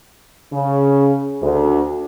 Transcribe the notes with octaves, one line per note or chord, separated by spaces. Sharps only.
C#3
D2